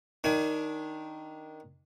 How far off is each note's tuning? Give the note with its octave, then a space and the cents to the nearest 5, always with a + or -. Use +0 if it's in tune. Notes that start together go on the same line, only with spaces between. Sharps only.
D#3 +0 D4 -15 G#5 +25